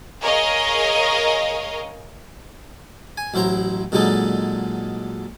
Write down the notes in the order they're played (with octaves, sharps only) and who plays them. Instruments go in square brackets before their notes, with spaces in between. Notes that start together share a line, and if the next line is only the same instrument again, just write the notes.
[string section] G#4 A#4 C#5 D#5 F5
[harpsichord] G#5
A1 F#3 E4 C5 A#5
A#2 D3 F#3 G#3 D#4 A4